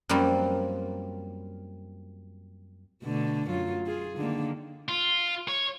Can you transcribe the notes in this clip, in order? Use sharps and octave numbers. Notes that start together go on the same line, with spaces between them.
F#2 F3 G3 A#3 C4
B2 D3 A3
F#2 F#3 F4
F4 G#4
D3 D#3 A#3
F4
C#5